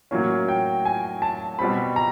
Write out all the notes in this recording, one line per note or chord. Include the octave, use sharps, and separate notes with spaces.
A2 F#3 A#3 C#4
G5
G#5
A5
B2 G3 C4 B5
A#5